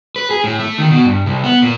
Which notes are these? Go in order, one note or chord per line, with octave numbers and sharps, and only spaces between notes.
B4
G#4
A2
A3
D#3
B2
G2
C2
B3
A#2